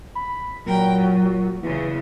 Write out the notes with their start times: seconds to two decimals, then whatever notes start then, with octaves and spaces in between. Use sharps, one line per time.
0.15 B5
0.66 A#2 F#3 A#4 G5
0.95 F#2
1.63 E2 C#3 E3